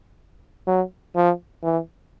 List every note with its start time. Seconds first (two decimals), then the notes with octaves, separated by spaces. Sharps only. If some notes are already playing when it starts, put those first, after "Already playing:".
0.67 F#3
1.16 F3
1.63 E3